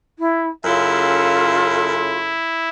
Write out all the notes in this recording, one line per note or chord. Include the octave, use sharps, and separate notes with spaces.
E4
F#2 C#3 E4 F4 A4